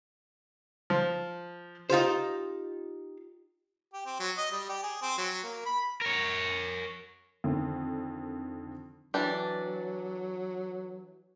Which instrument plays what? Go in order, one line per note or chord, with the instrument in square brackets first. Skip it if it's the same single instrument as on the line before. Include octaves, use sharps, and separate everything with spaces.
[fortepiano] F3
[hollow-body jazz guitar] D#4 F4 G4 C5
[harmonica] G4
C4
F#3
D#5
G3
G4
G#4
C4
F#3
A#3
B5
[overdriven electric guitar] A#4 C#5
[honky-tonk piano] F2 D3 D#3
[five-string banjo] E3 D4 G4 [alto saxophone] F#3